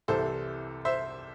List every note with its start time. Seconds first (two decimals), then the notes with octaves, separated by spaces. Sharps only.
0.08 C2 C3 E3 A4 C5
0.85 C5 E5